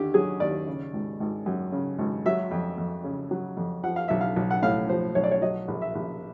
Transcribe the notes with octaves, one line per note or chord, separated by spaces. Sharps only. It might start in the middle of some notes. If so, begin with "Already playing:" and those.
Already playing: D#2 D3 G4
F#3 G#4
D#2 D5
C#3
G#1
G#1
F#2
C#3
G#1
F#3 E5
F2
F2
C#3
F#3
F2
F3 F#5
F5
B1 E5
F5
B1
F#5
A2 F5
F3 C5
B1 C#5
D5
C#5
F#3 D#5
A#1
E5
A#1